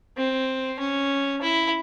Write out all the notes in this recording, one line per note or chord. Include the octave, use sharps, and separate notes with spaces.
C4
C#4
E4